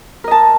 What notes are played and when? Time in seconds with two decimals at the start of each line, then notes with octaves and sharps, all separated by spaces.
0.24 A#4
0.28 D#5
0.31 A5